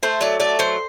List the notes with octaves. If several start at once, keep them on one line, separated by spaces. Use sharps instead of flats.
A3 C5
F#3 D5
A3 D5
F#3 C5